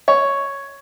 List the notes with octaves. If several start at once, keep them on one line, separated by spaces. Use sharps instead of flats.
C#5